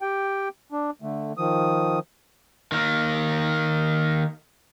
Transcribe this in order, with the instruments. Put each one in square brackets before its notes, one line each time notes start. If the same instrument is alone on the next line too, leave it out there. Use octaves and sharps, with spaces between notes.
[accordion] G4 G5
D4
D3 A3
D#3 F3 D#6
[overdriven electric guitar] D#3 A#3